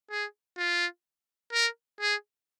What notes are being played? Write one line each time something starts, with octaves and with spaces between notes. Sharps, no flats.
G#4
F4
A#4
G#4